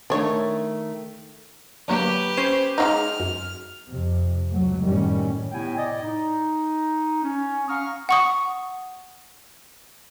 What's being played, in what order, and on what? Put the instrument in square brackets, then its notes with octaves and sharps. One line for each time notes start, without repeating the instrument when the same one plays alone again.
[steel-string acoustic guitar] D#3 A3 [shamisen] D4 C#5
[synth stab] D3 F#3 A#3 [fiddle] G4 B4
[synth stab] C#4 C5 G6
[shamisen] G#3 D4 D#4 [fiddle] F6
[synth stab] F#2
[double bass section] F2 C3
C#2 F#3 A3
F#2 A2 D#3 G3 A3 C#4
[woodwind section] A2 C3 B3 E4 G5 G#5
A2 D5 D#5
D#4
C#4
F5 F#5 A#5 C#6 D#6 F6
[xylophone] F#5 C#6 D#6